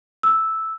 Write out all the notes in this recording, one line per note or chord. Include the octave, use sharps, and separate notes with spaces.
E6